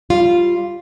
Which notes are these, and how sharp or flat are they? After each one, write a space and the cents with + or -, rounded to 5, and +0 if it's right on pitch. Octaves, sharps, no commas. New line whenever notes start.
G3 +0 F4 +0